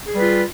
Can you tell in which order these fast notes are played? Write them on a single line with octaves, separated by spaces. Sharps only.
G#4 G3 B4 F4